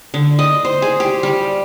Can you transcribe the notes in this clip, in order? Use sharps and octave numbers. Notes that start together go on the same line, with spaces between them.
D3
D#5
C5
G#4
G4
G3